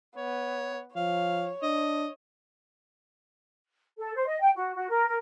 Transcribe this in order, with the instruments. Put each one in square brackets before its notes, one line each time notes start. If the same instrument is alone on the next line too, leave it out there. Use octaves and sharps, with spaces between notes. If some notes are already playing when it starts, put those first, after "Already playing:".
[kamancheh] B3 [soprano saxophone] C#5
[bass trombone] F3 [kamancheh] C#5 [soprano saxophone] F5
[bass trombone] D4 [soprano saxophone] D#5
[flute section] A4
C5
D#5
G5
F#4
F#4
A#4
A#4